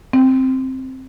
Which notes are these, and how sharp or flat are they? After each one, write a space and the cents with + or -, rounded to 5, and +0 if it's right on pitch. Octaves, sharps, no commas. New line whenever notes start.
C4 +5